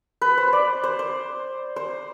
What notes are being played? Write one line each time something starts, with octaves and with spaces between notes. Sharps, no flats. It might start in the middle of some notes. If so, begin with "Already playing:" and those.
B4
C5
D5
C5
C5
C5